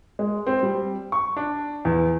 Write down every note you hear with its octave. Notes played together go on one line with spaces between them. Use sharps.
G#3
C4
G3
C#6
D4
E2